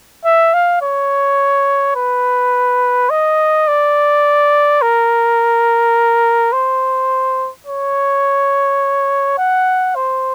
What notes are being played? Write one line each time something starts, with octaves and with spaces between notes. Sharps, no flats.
E5
F5
C#5
B4
D#5
D5
A#4
C5
C#5
F#5
C5